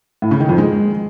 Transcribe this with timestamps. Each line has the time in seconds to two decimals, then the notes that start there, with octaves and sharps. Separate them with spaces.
0.22 A2
0.31 C#3
0.40 D#3
0.49 F2
0.58 G#3